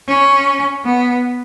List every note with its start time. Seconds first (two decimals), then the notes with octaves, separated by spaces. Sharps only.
0.09 C#4
0.85 B3